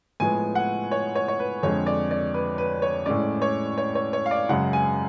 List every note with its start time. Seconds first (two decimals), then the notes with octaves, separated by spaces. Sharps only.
0.20 A2 F3 G#3 B3 G#5
0.55 F#5
0.91 C#5
1.15 C#5
1.28 C#5
1.39 B4
1.63 F2 D3 G#3 C#5
1.86 D5
2.11 D5
2.34 B4
2.58 B4
2.82 C#5
3.06 A2 G#3 C#4 D5
3.42 C#5
3.78 C#5
3.95 C#5
4.13 C#5
4.26 F5
4.31 D5
4.49 F#2 C#3 G#3 F#5
4.73 G#5